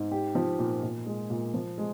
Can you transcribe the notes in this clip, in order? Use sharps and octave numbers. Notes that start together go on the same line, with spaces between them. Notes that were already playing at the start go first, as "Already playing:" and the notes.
Already playing: G#2
G4
F3
A#2
A#2
G#3
A#2
F3
G#3